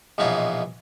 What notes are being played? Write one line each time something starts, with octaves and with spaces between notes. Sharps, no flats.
A#1 B2 E3 D#4 F4 C#5